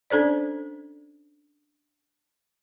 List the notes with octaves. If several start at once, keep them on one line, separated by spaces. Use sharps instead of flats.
C#4 D4 A4 C5 D5